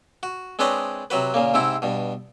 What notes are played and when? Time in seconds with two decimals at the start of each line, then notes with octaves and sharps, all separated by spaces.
0.23 F#4
0.59 G#3 C4 D4 B4 C#5 D#5
1.10 C3 F#3 F#4 B4
1.34 A#2 C#3 A#3
1.54 G#2 C3 C4 E4
1.82 G2 B2